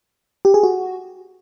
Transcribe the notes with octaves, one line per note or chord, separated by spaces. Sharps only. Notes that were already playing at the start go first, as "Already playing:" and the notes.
G4
G#4
F#4